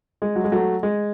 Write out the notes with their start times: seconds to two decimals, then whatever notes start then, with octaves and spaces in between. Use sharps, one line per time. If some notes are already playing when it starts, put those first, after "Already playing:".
0.22 G#3
0.36 F#3
0.44 G#3
0.52 F#3 A3
0.83 G#3